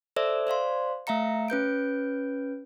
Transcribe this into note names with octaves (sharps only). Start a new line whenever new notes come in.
A4 C5 D5 E5 E6
C5 D5 F5 C6
A3 E5 F5 A#5 C#7
C#4 B4 G6 D7